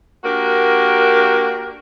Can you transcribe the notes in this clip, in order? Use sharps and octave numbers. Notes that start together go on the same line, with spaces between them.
A#3 D4 F#4 G4 A#4